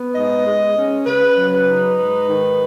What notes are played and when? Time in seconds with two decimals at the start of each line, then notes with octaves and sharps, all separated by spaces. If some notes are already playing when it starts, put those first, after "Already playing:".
Already playing: B3
0.15 G#2 D#5
0.45 G#3
0.76 C#4
1.06 C#3 B4
1.37 F#3
1.52 B4
1.68 D#4
1.98 G#2 B4
2.29 D#3